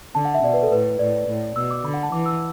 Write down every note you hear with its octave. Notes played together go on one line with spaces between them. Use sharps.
D3 A5
F#5
E5
B2 D5
B4
A4
A2 B4
A2 D5
A2
B2 E6
D6
D3 B5
F#5
A5
E3 D6
E6